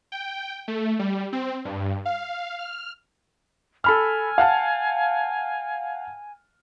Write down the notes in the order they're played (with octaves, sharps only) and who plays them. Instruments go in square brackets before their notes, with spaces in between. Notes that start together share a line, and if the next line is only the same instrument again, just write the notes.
[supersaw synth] G5
A3
G3
C4
G2
F5
F6
[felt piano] A4 B5 F6 [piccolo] G#5
[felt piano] F5 F#5 A5